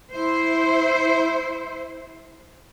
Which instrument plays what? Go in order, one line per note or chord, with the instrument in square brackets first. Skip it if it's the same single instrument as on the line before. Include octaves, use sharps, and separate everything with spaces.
[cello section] E4 C5